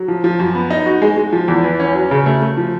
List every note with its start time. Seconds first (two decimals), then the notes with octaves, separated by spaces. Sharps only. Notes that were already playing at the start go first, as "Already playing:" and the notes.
Already playing: F#3
0.08 F3
0.24 F3
0.39 F#2
0.55 B3
0.70 D#4
0.86 F#4
1.02 G#3
1.17 G#3
1.32 F3
1.48 E2
1.64 E3
1.80 C#4
1.95 F#3
2.11 C#3
2.26 A3
2.42 A3
2.57 F3